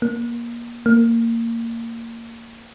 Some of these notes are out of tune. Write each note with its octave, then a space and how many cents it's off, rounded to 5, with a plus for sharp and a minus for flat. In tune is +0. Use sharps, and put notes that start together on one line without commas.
A#3 +25
A#3 -20